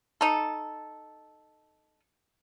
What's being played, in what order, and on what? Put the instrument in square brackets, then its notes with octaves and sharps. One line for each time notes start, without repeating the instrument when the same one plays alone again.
[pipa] D#4 A4